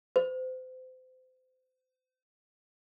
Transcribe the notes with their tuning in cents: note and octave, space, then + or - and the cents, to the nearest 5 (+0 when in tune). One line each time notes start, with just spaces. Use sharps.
C5 -35